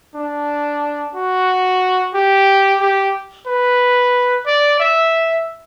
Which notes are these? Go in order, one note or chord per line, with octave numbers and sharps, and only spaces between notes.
D4
F#4
G4
G4
B4
D5
E5